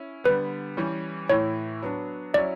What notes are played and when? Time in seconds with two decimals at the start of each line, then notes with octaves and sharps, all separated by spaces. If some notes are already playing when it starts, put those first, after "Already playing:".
Already playing: C#4 E4
0.24 D3 G3 B3 B4
0.77 E3 G3 C#4
1.29 A2 E3 A3 E4 C#5
1.82 F#3 B3 D4
2.34 F#3 C#4 E4 D5